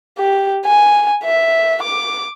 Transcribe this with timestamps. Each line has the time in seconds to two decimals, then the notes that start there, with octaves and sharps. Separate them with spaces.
0.19 G4
0.66 G#5
1.24 E5
1.83 D6